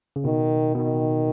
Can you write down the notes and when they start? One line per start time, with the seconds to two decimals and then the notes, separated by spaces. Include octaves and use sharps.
0.16 C#3
0.24 B2 D#3
0.75 B2 D#3